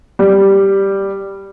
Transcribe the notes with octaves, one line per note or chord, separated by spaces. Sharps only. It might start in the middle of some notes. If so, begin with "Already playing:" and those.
G3